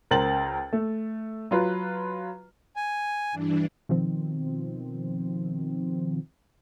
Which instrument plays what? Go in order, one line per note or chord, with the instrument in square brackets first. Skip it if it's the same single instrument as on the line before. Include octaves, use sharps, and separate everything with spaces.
[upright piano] C#2 A#4 C5 A6 F#7
A3
F#3 F4 B4
[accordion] G#5
[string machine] G2 E3 D4
[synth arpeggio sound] B2 D#3 F3 C4